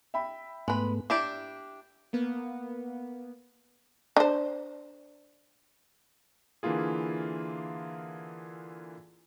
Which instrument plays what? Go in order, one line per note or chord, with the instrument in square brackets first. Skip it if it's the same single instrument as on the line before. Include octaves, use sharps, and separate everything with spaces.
[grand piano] E5 G5 B5
[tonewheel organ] G#2 A3 B3 [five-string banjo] G#3 B4
[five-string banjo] D4 E4 G4 D5
[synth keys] A#3 B3
[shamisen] D4 C5
[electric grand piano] D3 E3 A#3 E4 F4 G#4